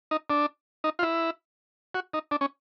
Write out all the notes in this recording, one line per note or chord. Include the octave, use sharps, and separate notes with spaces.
D#4
D4
D#4
F4
E4
F#4
D#4
D4
C#4